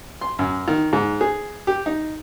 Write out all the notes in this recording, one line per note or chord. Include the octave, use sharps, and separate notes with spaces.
C6
F#2
D#3
G#2
G#4
G4
D#4